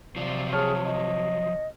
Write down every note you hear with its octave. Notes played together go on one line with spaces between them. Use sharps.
C3 F3 F#3 F4 D5
G#4 C#5 A5 F6
D#5